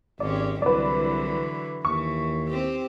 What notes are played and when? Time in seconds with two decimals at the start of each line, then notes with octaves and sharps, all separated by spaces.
0.20 G#1 G#3 C#4 G4 D5
0.62 C2 D3 E3 F#3 B4 D5
1.85 D#2 E3 C#6
2.50 C4 G4